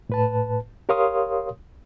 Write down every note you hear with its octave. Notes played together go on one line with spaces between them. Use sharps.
A2 B4 A5
G4 A#4 C#5 F5 C6 D#6